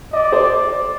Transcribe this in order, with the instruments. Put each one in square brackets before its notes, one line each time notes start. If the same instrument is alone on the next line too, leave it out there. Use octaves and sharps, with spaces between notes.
[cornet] D5 [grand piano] D#5
[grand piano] C5